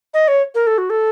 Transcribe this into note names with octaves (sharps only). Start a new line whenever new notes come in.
D#5
C#5
A#4
A4
F#4
A4